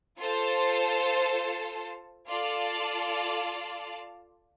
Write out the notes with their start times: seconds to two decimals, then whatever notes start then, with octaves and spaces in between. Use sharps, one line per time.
0.18 F4 A4 C5 A5
2.27 F4 A4 D5 F5 A5